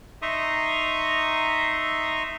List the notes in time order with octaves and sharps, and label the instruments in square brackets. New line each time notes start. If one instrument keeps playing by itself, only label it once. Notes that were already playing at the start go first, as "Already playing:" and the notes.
[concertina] D#4 E5 A#5 C6 C#6 D#6